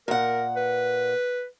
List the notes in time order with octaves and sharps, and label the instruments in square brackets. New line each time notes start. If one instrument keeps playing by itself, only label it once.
[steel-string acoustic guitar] A#2 F#5 [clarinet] A#4
[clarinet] B4